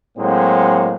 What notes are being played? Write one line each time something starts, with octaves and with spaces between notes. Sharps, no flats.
A2 F#3 G#3 A#3 C4